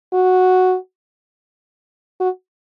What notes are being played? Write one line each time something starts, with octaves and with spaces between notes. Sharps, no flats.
F#4
F#4